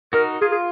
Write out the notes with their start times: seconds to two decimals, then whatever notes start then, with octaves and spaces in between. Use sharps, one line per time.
0.13 D#4 F#4 A#4
0.41 F4 G#4
0.52 G#4